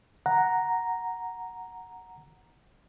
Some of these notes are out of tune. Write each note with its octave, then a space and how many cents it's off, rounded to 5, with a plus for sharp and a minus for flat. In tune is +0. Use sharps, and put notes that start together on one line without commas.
F#5 +0 A#5 +0